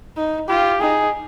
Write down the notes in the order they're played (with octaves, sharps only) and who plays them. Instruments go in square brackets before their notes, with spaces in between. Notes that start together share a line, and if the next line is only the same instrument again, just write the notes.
[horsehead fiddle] D#4
[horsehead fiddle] F4 [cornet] G4
[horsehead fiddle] D#4 [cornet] G#4